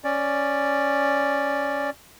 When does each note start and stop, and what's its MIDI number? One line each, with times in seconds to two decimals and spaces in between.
0.04 1.90 61
0.04 1.90 74